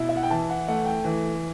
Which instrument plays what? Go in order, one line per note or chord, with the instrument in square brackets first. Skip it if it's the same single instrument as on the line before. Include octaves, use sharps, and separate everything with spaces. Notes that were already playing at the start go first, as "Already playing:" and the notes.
Already playing: [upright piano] B2 E4
E5
F#5
G5
E3 A5
F#5
A3 F#5
G5
E3